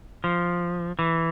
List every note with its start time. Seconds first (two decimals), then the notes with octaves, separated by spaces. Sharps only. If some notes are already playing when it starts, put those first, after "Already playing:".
0.24 F3
0.99 E3